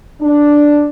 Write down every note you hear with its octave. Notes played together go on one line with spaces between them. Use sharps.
D4